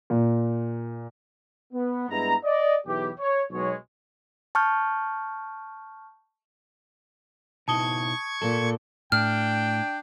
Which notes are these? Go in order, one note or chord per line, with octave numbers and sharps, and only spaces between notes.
A#2
B3
G2 G#3 B3 E4 A#5
D5 D#5
B1 E2 E3 E4 G4
C#5
B1 B2 F#3 G#3 C#5
A5 C#6 F6 G6
B2 D#4 E4 A5 C#6 D#6 G#6 G7
A#2 A4
A2 D4 G5 F6